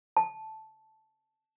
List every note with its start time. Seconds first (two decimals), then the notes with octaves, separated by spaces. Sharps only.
0.17 A5